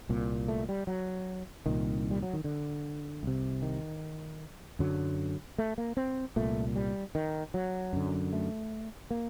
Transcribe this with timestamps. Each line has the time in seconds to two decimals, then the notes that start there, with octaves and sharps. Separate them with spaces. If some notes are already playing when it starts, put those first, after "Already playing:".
0.09 C2 A#2
0.48 A3
0.69 G3
0.87 F#3
1.66 C2 A#2 D#3
2.11 G3
2.23 F#3
2.33 D#3
2.44 D3
3.23 C2 C3
3.62 D#3
4.79 F#2 D3 F#3
5.58 A3
5.78 A#3
5.97 C4
6.36 C2 A#2 A3
6.76 G3
7.15 D#3
7.54 F#3
7.93 F#2 D3
8.33 A3
9.11 A#3